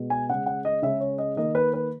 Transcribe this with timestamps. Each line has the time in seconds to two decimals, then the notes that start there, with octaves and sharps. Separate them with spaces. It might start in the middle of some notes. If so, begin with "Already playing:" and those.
Already playing: B2 G#3
0.10 G#5
0.29 C#3 G#3 F#5
0.46 F#5
0.65 D#5
0.82 C#3 G#3 E5
1.00 C#5
1.18 D#5
1.37 D#3 A#3 D#5
1.55 B4
1.74 B4